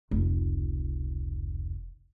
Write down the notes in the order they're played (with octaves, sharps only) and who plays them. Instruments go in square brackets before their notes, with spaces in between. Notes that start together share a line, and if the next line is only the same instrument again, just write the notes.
[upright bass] F1 C#2